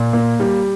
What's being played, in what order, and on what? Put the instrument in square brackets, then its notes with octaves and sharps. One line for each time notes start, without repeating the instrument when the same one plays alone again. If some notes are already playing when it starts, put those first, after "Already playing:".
Already playing: [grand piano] A#2
A#3
G3